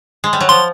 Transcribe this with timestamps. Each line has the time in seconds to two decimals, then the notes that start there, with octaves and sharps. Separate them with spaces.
0.24 G#3
0.33 G3
0.41 F#3
0.49 F3 C6